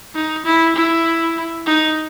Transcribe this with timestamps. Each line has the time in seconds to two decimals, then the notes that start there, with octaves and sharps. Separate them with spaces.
0.15 D#4
0.46 E4
0.76 E4
1.66 D#4